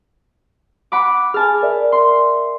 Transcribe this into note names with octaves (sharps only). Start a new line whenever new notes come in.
F#5 B5 D6
G#4 G#5 A5 F6
A#4 D5 E5
C6